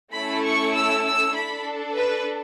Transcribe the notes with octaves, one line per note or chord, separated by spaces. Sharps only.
A3 C#4 E4 A4 B5
C#6
E6
E6
D4 A4 B5
B4